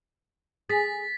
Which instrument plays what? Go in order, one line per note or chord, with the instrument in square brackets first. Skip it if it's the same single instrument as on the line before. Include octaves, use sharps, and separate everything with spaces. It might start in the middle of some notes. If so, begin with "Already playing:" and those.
[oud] G#4 [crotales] A6 B6